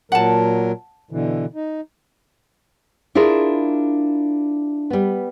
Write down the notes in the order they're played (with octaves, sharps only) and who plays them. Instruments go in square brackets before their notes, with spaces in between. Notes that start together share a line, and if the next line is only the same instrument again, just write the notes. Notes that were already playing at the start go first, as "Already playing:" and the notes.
[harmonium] A#2 F#3 A#4 [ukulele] F#5 A5
[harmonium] B2 D3 E3
D#4
[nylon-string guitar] D4 E4 F4 G#4 A#4
G3 B3